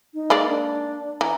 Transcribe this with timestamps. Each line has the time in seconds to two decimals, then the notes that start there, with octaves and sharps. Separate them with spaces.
0.14 D#4
0.30 G#3 A#3 D5
0.49 D4
1.21 E3 A#5